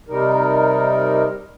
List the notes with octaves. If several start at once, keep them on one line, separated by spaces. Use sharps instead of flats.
C3 G3 D#4 A#4